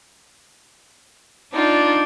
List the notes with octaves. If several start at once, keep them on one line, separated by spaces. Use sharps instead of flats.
D4 D#4 F4